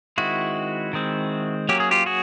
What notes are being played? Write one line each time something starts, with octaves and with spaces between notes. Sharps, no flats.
D#3 G#3 C4 E4 F#4
D#3 G#3 C4
F#3 A#3 C#4 G4
G#4
F4 G4
F#4 G#4